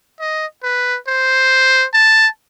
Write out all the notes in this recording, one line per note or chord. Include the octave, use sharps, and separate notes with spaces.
D#5
B4
C5
A5